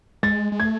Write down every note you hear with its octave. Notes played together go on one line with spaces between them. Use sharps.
G#3 A6
G#3
A3 G#6